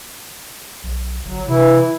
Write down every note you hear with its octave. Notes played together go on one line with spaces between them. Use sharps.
B1
G1 F#3
C3 E3 E4